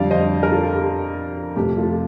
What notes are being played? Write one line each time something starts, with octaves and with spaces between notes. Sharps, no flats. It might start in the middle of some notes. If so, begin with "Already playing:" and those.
Already playing: F2 D3 G3 D5 F5
C5 D#5
A#4
F4 A4
G4
F2 C3 F3 A3 G4
F4 A4